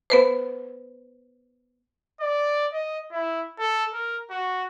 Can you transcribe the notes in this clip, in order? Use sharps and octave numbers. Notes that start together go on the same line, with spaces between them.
B3 B4 C5
D5
D#5
E4
A4
A#4
F#4